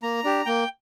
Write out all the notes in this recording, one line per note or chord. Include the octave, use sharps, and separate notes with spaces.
A#3 A#5
D4 G4
A#3 G5